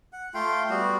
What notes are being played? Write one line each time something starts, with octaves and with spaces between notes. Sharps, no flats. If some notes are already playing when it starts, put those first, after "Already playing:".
F#5
A3 F4 F5 G5
G3 B3 F#4